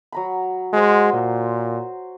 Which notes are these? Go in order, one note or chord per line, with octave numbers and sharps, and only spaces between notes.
F#3 A#5 B5
G#3 F#4 C5
A#2